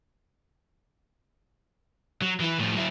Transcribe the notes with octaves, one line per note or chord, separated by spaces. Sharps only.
F#3
E3 E4
A2 F3
F#3 E4